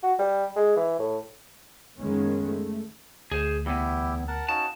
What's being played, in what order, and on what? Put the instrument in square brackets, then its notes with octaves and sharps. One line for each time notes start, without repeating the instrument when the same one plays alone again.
[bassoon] F#4
G3
G#3
E3
A2
[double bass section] F#1 D#3 G#3 A#3 B3 C#4
A3
[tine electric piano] D2 [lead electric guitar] G#4 C5
[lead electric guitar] E2 B3 [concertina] E4 G4
[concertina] A#4 F#5 A5
[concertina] C#4 D#4 F#4 [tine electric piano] F5 [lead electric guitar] A5